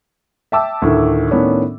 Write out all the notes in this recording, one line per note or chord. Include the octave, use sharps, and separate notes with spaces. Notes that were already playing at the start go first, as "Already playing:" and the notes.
E5 G5 A5 D6 E6
D2 A2 D#3
A2 D#3 B3 C#4 D4